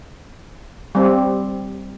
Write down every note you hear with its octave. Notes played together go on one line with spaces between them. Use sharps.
G3 C4